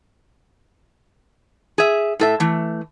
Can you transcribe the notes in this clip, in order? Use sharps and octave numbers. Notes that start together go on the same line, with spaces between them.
G#4 E5
A2 A4 E5
E3 A3